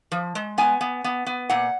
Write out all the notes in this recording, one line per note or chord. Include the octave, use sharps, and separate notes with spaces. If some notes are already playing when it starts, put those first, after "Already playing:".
F3
G#3
B3 G#5
B3
B3
B3
A#2 F#5